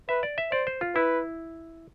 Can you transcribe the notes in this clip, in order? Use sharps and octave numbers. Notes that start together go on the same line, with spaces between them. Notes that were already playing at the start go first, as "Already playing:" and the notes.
B4 E5
D5
E5
C5 D5
C5
F4
E4 B4